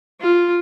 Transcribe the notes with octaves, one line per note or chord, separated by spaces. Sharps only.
F4